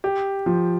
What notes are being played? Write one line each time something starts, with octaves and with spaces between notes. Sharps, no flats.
G4
F3